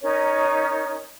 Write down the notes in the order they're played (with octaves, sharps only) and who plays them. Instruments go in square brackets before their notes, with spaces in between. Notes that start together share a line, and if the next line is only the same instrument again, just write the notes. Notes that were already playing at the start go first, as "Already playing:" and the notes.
[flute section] C#4 D#4 A#4 C#5